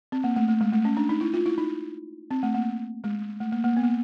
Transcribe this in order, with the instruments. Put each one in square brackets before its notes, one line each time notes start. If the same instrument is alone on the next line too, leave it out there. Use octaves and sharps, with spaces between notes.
[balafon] C4
A#3
A3
A3
G#3
A3
C#4
D4
D#4
E4
F4
E4
D#4
C4
A3
A#3
G#3
A3
A#3
A#3
B3
A#3